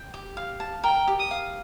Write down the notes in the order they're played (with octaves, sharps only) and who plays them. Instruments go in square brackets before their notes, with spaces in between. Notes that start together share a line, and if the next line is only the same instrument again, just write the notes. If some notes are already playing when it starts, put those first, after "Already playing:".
Already playing: [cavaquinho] G5
G4
F5
A5
[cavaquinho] A#4 [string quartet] G5
[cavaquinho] G4
[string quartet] D#6
[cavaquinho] F5